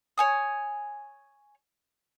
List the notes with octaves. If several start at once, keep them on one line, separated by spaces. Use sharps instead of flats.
C#5 G#5 D#6